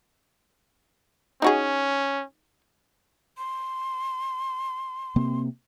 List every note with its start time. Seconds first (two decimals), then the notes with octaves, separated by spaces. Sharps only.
1.42 C#4 D#4 F#4 G#4
3.38 C6
5.16 C3 A#3 C4